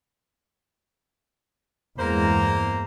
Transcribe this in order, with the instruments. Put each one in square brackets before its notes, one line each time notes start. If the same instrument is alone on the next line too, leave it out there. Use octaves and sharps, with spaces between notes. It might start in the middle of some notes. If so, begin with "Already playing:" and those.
[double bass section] E2 G2 G#3 [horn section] A#3 C5 A#5